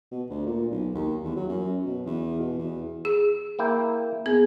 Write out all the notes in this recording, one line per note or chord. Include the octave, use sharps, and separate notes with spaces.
B2
D2
A#2
B1
D#2
E2
F#3
F#2
B2
E2
B2
E2
G#4
A#3 E4 G5
B3 G#4